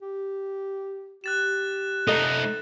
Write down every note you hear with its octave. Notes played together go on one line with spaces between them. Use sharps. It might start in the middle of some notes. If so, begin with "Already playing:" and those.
G4
G4 F#6 A6 E7
A3 D#4 A4 D#5